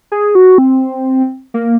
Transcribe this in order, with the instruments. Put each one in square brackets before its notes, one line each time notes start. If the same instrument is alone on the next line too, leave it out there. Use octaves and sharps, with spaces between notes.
[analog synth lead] G#4
F#4
C4
A#3